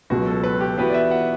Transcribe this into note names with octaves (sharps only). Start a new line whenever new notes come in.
C#2 B2 F#3 F#4
A4
B4
G4
E3 B3 F#4 G4 B4
D5
E5
F#5